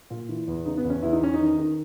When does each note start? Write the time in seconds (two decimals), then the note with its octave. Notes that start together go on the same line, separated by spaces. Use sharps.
0.10 A#2
0.29 E3
0.48 E2
0.66 C#3 D#4
0.78 B3
0.84 E2
0.90 C#4
1.02 E2 E4
1.13 D#4
1.21 E2 C#4
1.34 D#4
1.39 D#3
1.57 D#3